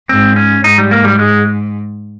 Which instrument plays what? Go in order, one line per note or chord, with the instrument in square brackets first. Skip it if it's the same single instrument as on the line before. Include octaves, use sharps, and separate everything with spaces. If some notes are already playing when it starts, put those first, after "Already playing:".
[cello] G#2 [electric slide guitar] C4
[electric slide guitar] C#4
[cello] G#2 [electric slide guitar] D#4
[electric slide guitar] G3
A#3
G3
G#3